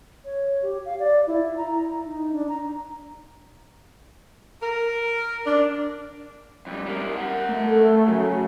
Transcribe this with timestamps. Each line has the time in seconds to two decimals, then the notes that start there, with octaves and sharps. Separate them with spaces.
0.25 C#5
0.62 G4
0.85 F5
1.00 D5
1.27 E4
1.57 A#5
2.06 D#4
2.31 D4
2.49 A#5
4.61 A#4
5.46 D4
6.67 F2 G3
6.86 G3 A#4
7.18 A#4 F#5
7.49 A3
8.08 C#3 F#3